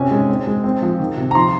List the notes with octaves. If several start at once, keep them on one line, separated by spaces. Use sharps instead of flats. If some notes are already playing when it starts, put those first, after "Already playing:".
Already playing: C3 C#4 G#5
G#3
C4
G#3
C4
F3
D#3
C3
A#5
F3 C6